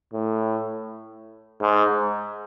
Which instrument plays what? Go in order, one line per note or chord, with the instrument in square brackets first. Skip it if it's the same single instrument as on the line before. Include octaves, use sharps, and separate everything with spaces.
[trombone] A2
G#2